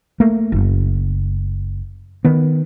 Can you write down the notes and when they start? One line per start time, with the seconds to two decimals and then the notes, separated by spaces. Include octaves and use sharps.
0.20 A3 A#3
0.52 F#1
2.25 D#3 B3